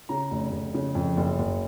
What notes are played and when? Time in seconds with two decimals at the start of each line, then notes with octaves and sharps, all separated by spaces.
0.09 C#3 A#5
0.31 F1
0.52 F1
0.74 C#3
0.95 F2
1.17 F#1
1.39 F#1